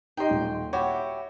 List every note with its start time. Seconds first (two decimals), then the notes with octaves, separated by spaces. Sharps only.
0.17 D#4 G4 D#5 G5 C6
0.30 D#1
0.73 E4 F#4 G4 C#5